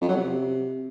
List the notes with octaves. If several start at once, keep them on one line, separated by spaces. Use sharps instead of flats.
F2
F#3
C3